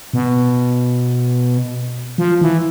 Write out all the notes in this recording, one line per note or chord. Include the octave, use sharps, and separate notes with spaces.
B2
F3
E3